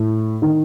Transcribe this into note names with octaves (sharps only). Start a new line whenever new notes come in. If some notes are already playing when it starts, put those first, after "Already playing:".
Already playing: A2
D#3